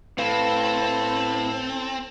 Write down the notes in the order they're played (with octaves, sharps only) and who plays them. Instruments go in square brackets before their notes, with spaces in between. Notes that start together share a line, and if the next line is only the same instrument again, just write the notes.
[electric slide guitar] A2 [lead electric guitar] C4 [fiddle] A4 [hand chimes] B4 F5 B5